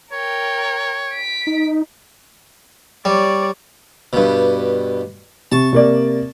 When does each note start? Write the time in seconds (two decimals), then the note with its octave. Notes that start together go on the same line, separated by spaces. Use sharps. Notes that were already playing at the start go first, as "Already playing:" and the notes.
0.12 A#4 C#5 G5
1.10 B6 D7
1.47 D#4
3.05 G3 C#5 D5
4.13 G2 B2
5.52 C3 A5 C#6
5.73 C3 A#3 D5